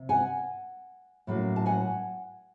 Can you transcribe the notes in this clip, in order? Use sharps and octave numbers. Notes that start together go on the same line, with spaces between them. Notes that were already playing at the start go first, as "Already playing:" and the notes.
Already playing: C3
F#5 G#5
A2 F#3 A#3 C#4
A5
F#5 G#5